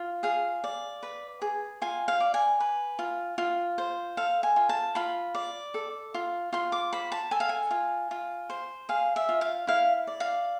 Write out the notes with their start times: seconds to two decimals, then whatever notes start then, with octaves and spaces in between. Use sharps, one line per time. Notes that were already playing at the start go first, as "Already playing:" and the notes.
Already playing: F4
0.23 G#4 F5
0.64 D5
1.03 B4
1.42 G#4
1.82 F4 G#5
2.08 F5
2.20 D5
2.34 G#5
2.60 B4
2.99 F4
3.38 F4
3.78 C5
4.17 A4 F5
4.43 G#5
4.56 F4
4.69 A5
4.95 F4 B5
5.35 D5
5.74 A4
6.14 F4
6.53 F4 C6
6.72 D6
6.93 C5 B5
7.12 A5
7.31 A4 G#5
7.40 F5
7.49 G#5
7.71 F4
8.11 F4
8.50 C5
8.89 G#4 F5
9.16 E5
9.29 F4
9.41 F5
9.67 E4 F5
10.07 D5
10.20 F5